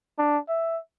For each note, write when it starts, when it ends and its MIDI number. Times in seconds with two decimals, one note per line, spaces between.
0.19 0.38 62
0.49 0.78 76